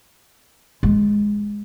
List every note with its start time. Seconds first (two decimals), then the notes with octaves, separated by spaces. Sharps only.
0.83 G#3